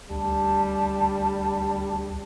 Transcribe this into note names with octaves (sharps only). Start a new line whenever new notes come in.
D2 G3 A5